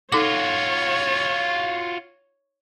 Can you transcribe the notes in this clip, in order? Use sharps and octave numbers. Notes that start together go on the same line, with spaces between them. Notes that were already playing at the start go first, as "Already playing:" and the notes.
D#4 F4 F#4 A4 C#5 D6